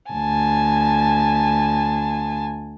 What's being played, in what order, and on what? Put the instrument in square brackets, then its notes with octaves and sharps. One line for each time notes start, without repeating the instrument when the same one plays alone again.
[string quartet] D2 G#5 A5